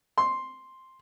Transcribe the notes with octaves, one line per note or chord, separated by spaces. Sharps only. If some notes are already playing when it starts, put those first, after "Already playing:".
C6